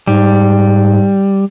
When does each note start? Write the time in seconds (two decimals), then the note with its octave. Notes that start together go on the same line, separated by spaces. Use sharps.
0.07 G#2 G3